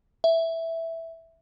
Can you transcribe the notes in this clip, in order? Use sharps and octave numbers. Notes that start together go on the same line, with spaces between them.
E5